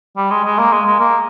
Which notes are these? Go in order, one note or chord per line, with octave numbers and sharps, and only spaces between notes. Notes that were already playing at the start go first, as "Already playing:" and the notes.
G3
G#3
G#3
A#3
G#3
G#3
A#3